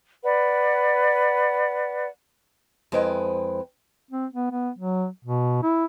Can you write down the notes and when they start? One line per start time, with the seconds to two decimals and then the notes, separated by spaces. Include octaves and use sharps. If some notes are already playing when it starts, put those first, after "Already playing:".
0.24 B4 D5 F#5
2.92 F2 G#3 E4 B4 C5 G5
4.11 C4
4.33 B3
4.51 B3
4.78 F#3
5.24 B2
5.63 E4